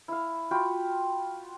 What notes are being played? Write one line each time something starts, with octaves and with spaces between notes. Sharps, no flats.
E4 F5
F4 F#4 G5 B5